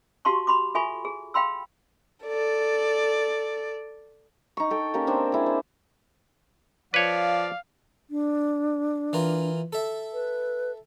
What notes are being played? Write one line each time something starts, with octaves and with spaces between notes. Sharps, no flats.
F#4 G4 F5 A5 C6 C#6
B5 C6 D6
F4 A4 E5 G#5 B5 C#6
G#4
F5 G5 B5 C6 E6
A4 D5
D#4 C#6
A4 G5
A#3 C#4 G4 A#4
C4 D4 C5
E4 G#4
C5
F3 B4 C#5 D5 F5
D4
E3 F4 A#4
A4 E5
B4